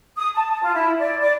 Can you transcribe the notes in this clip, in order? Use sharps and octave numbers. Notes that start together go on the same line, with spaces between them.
D#6
A5
F4
E4
D5
D5